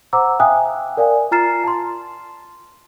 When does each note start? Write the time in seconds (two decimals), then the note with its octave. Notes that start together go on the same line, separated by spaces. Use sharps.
0.13 C5 F#5 A#5 D6 E6
0.40 E5 F5 G5 G#5 D#6 F#6
0.97 A#4 D5 F5 G#5
1.32 F4 A#5 F6 A6 C7 E7
1.64 A5 C6